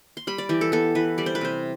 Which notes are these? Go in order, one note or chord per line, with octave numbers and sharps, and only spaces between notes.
C6
G3 B5
D5
E3 G4
A4
B3 A4
E3 B4
G3 D5
C5
B4
C3 C5